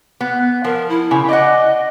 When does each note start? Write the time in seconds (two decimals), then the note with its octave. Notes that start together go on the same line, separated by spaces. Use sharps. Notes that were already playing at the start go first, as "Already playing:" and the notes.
0.21 B3
0.64 F3 A#4
0.89 E4
1.11 C#3
1.29 D5 D#5 F#5